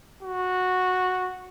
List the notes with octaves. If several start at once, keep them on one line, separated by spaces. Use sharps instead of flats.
F#4